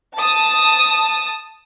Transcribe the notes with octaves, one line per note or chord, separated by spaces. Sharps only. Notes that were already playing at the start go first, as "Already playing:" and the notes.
A5 D#6